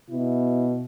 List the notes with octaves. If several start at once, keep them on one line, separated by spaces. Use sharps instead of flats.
B2 E4